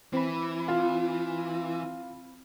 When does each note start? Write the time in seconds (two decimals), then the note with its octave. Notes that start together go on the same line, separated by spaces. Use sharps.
0.13 E3 C4 B5
0.68 F4